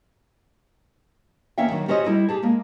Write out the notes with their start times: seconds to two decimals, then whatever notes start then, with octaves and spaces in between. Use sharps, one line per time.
1.58 E2 A#3 C#4 E5 F5 G5
1.70 D3 D#3 F#3
1.88 C#4 F#4 G4 C5 C#5 D#5
2.04 G3 E4 A4 D#5
2.29 G4 G#4 A5
2.42 G#3 A#3